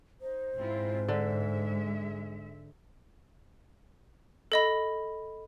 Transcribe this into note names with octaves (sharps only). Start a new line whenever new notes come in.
D#4 C5
G#2 C4 E4 F4
D3 G#3 E5
A4 D#5 B5